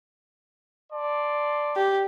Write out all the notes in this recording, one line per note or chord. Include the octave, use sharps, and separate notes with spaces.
D5 A5 C6
G4